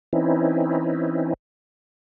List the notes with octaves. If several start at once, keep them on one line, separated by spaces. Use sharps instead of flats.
E3 C4 C#4 D#4 E4